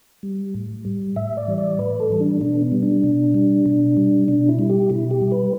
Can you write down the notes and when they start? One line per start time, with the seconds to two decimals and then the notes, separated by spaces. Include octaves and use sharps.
0.23 G3
0.54 A2
0.85 G3
1.16 A2 E5
1.37 D5
1.48 E3 G3
1.58 D5
1.79 A2 B4
2.00 A4
2.10 E3 G3
2.20 D4
2.41 B2 D4
2.61 B3
2.72 G3
2.83 D4
3.03 B2
3.34 G3
3.66 B2
3.97 G3
4.28 B2 D4
4.49 E4
4.59 G3
4.70 G4
4.90 B2 E4
5.11 G4
5.21 G3
5.32 B4